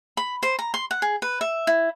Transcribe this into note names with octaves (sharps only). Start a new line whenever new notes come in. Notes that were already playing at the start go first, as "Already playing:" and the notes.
B5
C5
A#5
C6
F#5
G#4
B4
E5
E4